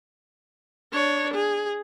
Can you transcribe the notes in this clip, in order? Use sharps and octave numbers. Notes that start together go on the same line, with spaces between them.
D4 C#5
G#4